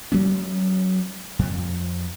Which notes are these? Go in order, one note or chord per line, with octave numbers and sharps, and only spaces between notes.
F#3 G#3 C#4
F2